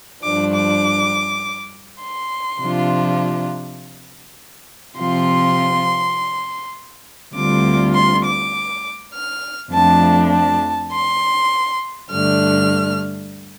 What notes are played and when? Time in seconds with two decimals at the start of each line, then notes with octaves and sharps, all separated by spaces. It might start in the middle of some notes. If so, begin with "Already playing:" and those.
0.23 G2 F3 D4 D6
0.53 D6
2.02 C6
2.61 C3 F3 D4 F4
4.98 C3 F3 C4 F4 C6
7.35 D2 D3 G3 C4 F4 D6
7.95 C6
8.24 D6
9.14 F6
9.72 F2 F3 A3 D4 A5
10.32 A5
10.91 C6
12.10 G2 D3 A3 D4 F6